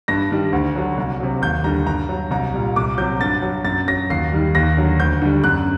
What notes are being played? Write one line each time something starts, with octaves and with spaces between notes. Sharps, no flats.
G2 A#6
D#3 G3
D2
D3 F#3
C2
C3 F#3
D#2 G6
D3 G3 A#5
G2 A#5
F#3
C2 A#5
A#2 G3
C2 D6
C3 F#3 G6
G2 A6
F#3
F#2 A6
F#3 A#6
D#2 C7
D#3 G3
D#2 A#6
D3 F#3
D2 G6
D3 G3
F#2 F#6